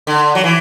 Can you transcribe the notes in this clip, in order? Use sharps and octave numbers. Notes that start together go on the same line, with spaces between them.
D3
F#3
E3